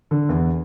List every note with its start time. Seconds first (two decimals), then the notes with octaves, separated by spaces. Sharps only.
0.11 D3
0.29 E2